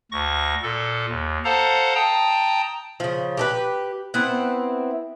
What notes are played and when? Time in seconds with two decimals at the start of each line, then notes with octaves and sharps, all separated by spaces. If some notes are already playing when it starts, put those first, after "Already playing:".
0.12 D2 C#6 A#6
0.63 A#2 A4
1.09 D#2
1.44 A4 C5 F5 F#5 A5 A#5
1.95 G5 A5 A#5 D#6
3.00 C#3 F3
3.37 G4 A4 B4
4.14 B3 C4 E4 F#5